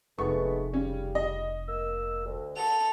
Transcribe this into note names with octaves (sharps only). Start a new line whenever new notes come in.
F1 G#3 A3 B3 C#6
C#3 G3 C#4
D#5
A#3 E6
D2
A4 F#5 F7